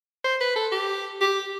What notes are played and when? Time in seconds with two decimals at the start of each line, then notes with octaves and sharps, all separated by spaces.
0.24 C5
0.41 B4
0.56 A4
0.72 G4
1.21 G4